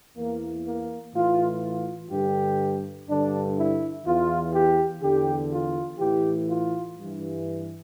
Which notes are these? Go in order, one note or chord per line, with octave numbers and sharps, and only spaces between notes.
E2 E3 A#3
A#3
A2 E3 F4
F4
G2 D3 G4
G2 D3 D4
E4
E2 E3 F4
G4
E2 D3 G4
F4
A2 E3 G4
F4
G2 E3